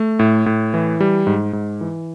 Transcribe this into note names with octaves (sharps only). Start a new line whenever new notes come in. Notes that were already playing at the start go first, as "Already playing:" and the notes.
Already playing: A3
A2
A2
E3
G3
G#2
G#2
E3